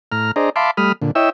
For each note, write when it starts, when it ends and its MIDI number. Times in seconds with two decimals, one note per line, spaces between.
0.12 0.31 45
0.12 0.31 82
0.12 0.31 89
0.36 0.50 62
0.36 0.50 68
0.36 0.50 72
0.36 0.50 74
0.36 0.50 75
0.36 0.50 82
0.56 0.71 76
0.56 0.71 77
0.56 0.71 81
0.56 0.71 83
0.56 0.71 84
0.56 0.71 86
0.77 0.92 55
0.77 0.92 57
0.77 0.92 83
0.77 0.92 87
0.77 0.92 89
1.02 1.11 46
1.02 1.11 50
1.15 1.30 64
1.15 1.30 73
1.15 1.30 75
1.15 1.30 76
1.15 1.30 79
1.15 1.30 88